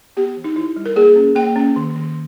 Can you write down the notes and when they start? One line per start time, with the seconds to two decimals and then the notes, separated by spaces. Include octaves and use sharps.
0.17 B3 G4
0.37 E3
0.44 D#4
0.56 E3 E4
0.76 G3
0.86 A#4
0.96 A#3 G#4
1.16 C#4
1.36 A#3 G5
1.56 C#4
1.76 D#3
1.96 D#3